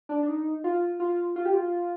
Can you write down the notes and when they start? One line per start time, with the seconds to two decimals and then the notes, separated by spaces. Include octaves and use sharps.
0.09 D4
0.23 D4
0.28 D#4
0.64 F4
1.00 F4
1.36 F4
1.45 G4
1.54 F4